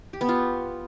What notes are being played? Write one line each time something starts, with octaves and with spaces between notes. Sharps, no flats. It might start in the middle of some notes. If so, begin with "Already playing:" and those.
G4
B3
F4